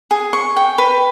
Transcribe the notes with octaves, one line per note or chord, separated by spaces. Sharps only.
G#4
C#6
G5
B4